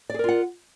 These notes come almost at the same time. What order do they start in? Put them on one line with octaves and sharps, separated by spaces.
D5 G#4 A#4 F4 F#5